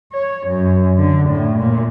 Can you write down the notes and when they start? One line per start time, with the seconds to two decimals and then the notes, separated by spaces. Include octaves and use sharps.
0.13 C#5
0.47 F#2
0.98 D3
1.30 A2
1.58 A#2